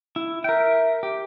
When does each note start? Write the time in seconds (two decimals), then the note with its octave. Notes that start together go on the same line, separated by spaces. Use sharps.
0.16 E4
0.44 A#4 E5 G5
1.03 G4